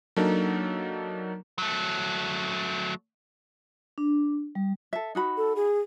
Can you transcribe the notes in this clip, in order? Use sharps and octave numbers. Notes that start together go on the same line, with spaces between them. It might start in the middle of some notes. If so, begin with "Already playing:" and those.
F#3 A#3 D4 D#4 A4 A#4
F#3 A3
D4
G3
A4 E5
D#4 F#4 B5
A4
G#4